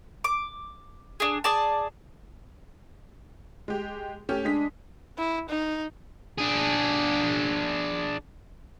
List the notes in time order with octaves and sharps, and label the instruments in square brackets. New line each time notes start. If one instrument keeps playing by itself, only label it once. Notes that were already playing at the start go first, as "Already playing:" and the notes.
[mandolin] D6
D4 G#4
G#4 D5 A5
[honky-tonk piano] G#3 G4
A3 C#4 G4
[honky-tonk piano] G#3 G#4 B6 [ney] D4
[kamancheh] E4
D#4
[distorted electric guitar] D4 G#4